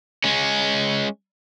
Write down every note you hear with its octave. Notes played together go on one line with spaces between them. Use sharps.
G#3 C#4